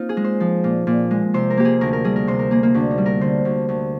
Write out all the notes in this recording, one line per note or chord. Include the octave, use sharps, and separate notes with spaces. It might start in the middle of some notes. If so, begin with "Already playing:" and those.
Already playing: A#3 C4 D#4 F4
G#4
G#3
C5
F3
A#2
A#2
G#3
C3 C5
A#4
A#3 G4
G#4
D2 A#4
A#4
G3 G#4
A#4
C3 C5
A#4
A#3 G#4
A#3
D2 D4
D#4
G3
A#4
D3 C5
D2
D2